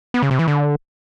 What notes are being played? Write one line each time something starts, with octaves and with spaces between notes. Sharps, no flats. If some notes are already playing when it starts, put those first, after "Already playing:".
B3
C#3
C3
E3
D3